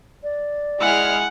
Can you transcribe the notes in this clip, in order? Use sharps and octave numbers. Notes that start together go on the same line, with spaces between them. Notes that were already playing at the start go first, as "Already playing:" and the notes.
D5
G#3 E4 G#4 F#5 F6